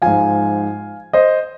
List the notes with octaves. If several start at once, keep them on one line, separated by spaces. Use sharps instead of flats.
G#2 F3 F5 G#5
C5 D#5